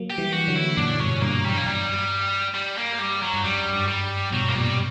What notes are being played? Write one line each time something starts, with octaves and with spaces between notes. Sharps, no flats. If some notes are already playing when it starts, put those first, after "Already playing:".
Already playing: F#3 A#3
G4
E3 G3
F#4
D3 F#3
E4
F#2 A#2 D4
G2 B2 C#4
G2 A#3
G2 G3
A#3
G2 G3
G3
A#3
G3
F#3
G2
F#2 G3
G2
G3
G2 B2 F#3
A#3
F#2 A#2 G3